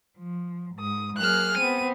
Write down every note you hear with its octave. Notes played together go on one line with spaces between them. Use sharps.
F3
G#2 D#6
F#3 A#3 G#4 F6 F#6
B3 C4 D#7